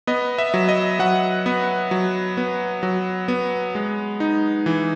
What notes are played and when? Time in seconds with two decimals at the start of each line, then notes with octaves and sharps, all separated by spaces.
0.07 B3 D#5
0.38 E5
0.54 F#3
0.69 D#5
0.99 F#3 F#5
1.46 B3
1.91 F#3
2.37 B3
2.83 F#3
3.28 B3
3.75 G#3
4.20 D#4
4.66 E3